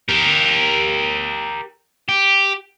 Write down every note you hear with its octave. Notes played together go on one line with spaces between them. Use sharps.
G4 A#4
G4